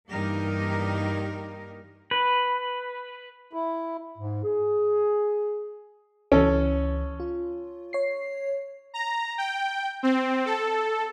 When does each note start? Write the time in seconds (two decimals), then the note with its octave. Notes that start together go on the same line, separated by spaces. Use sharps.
0.11 G2 E3 A#3 D#4 G4 A#4
2.11 B4
3.53 E4
4.17 G#2
4.43 G#4
6.32 C#2 E3 C#4 A4
7.20 F4
7.93 C#5 C7
8.94 A#5
9.38 G5
10.03 C4
10.45 A4